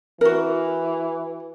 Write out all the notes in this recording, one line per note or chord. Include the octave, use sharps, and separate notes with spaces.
E3 F#4 A#4